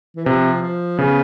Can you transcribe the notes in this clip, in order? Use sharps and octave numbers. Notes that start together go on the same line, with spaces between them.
E3
C3 F3
F3
C#3 B3